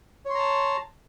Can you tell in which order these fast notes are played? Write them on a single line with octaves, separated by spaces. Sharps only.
C#5 C6 A#5 A5